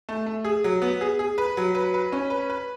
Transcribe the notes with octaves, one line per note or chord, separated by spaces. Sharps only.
A3
A3
G#4
F#3
B3
G#4
G#4
B4
F#3
B4
B4
C#4
B4
B4